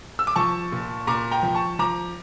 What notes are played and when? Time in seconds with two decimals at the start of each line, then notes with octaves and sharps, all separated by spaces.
0.19 E6
0.27 D6
0.36 F3 A5 C#6
0.72 A#2
1.07 A#2 A#5 D6
1.31 G5 A#5
1.43 F3
1.55 A5 C#6
1.79 F3 A#5 D6